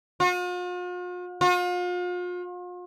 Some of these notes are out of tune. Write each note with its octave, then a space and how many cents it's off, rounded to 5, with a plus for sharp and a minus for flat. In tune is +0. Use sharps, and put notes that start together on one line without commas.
F4 +45
F4 +40